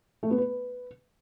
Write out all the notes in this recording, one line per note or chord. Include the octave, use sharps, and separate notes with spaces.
A3
B3
B4